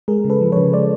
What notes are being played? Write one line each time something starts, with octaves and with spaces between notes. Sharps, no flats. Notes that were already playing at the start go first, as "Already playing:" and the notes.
G#3 G#4 A#4
C#3
A4 B4
F3
C#3 B4 C#5
G#3 C5 D5